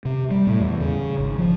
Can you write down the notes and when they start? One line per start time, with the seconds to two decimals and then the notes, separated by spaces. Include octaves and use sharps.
0.05 C3
0.31 G3
0.47 A2
0.60 E2
0.80 C#3
1.19 G#1
1.38 F3